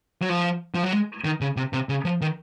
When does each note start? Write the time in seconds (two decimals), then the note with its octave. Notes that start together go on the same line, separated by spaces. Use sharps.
0.22 F#3
0.29 F3
0.75 F3
0.83 F#3
0.93 G#3
1.25 D#3
1.41 C#3
1.56 C3
1.73 C3
1.89 C#3
2.05 F3
2.21 D#3